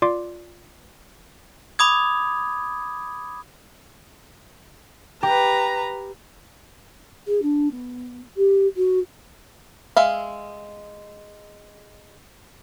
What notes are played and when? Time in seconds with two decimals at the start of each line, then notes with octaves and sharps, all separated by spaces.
0.02 F4 D5 C6 D6
1.79 B5 D6 D#6 G#6
5.23 G4 B4 A#5
7.27 G#4
7.42 D4
7.71 B3
8.36 G4
8.76 F#4
9.97 G#3 E5 F5